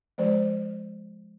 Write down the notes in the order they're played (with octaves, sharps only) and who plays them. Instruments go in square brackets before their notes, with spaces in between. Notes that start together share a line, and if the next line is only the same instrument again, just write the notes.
[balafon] F3 G#3 C5 D5